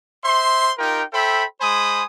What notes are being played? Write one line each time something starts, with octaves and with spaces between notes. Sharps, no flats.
C5 E5 C6
D#4 F4 G4 A#4 G5
A4 C5 E5 G5 B5
G#3 C5 G#5 B5 D#6